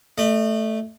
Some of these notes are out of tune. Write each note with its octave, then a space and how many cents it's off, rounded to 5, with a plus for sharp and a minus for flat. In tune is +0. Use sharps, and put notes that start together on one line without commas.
A3 +0 D#5 -45